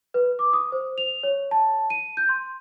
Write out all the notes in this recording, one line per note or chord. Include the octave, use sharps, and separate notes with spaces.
B4
D6
D#6
C5
F7
C#5
A5
D#7
G6
C6